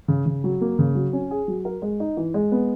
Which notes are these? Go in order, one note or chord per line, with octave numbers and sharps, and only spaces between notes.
C#3
C#3
F#3
A#3
C#3
F#3
C#4
G#4
F#3
A#4
G#3
D#4
E3
G#3
B3